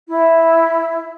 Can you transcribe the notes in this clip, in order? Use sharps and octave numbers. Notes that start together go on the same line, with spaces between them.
E4